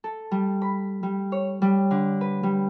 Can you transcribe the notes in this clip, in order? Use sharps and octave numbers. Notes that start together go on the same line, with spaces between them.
A4
G3
B5
G3
C#5
G3
D3
B4
G3